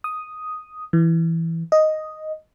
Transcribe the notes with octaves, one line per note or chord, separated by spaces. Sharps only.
D#6
E3
D#5